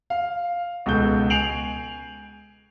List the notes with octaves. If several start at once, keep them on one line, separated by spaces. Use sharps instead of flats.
F5
C#2 B2 A4 G6
G#5 C7 D7 F7 F#7